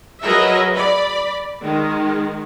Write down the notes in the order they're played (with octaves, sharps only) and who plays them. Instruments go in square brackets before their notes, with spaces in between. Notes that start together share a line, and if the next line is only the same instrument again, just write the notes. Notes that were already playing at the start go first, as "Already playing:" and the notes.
[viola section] F#3 G#4 A#4 B4 D#5 E5
D5 B5
D#3 G#3